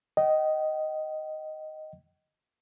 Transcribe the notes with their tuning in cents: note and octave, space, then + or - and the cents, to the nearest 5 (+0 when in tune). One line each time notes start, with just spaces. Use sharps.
D#5 +0 G5 -35